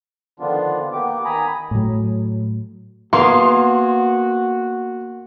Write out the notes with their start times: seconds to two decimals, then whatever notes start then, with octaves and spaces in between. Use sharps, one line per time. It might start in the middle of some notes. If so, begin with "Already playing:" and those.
0.40 D3 D#3 F3 B3 D4 F4
0.93 A#3 B3 G4 D6
1.25 D#3 G#5 A#5 B5 D#6
1.71 A2 F#3
3.13 A#3 B3 F#4 G#4 F5 C6